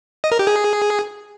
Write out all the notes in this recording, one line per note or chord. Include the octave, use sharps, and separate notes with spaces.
D#5
A#4
G4
G#4